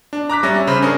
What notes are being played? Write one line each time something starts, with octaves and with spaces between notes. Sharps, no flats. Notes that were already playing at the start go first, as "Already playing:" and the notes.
D4
A#5 D6 F#6 B6
G3 C#4 E5 A#6
C#3 C5 B5
C#4 D4 G#4 A#4